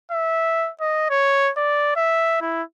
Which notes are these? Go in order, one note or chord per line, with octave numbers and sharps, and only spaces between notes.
E5
D#5
C#5
D5
E5
E4